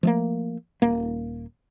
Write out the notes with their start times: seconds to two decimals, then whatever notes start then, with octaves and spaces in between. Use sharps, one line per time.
0.03 F3 A3 A#3
0.82 D#1 A#3